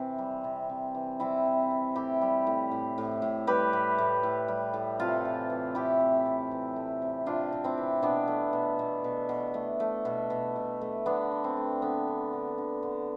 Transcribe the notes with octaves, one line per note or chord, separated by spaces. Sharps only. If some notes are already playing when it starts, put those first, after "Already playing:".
Already playing: C3 E3 C4
G3
C3
C3
E3
G3 C4 E4
C3
C3
A2 E4 G4
G3
A2
A2
A2
A2
G3 G4 B4
A2
A2
A2
G3
A2
C3 F4 A4
E3
E3
A3 E4 G4
C3
C3
E3
A3
C3
C3 D4 F4
C3
C4 E4
E3
B2 B3 D4
A3
B2
B2
B2
B2
A3
A3
B2
B2
B2
A3
D3 B3 D4
D3
C4
A3
D3 B3
D3
D3
D3
D3